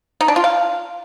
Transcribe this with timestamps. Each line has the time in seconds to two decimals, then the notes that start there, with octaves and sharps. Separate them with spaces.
0.21 D#4
0.28 D4
0.36 F4
0.44 F5